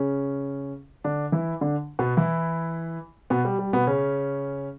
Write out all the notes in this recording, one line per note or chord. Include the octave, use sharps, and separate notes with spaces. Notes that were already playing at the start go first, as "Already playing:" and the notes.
Already playing: C#3 C#4
D3 D4
E3 E4
D3 D4
B2 B3
E3 E4
B2 B3
G3
G3
B2 B3
C#3 C#4